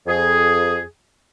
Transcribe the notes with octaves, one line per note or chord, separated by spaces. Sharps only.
F2 G#4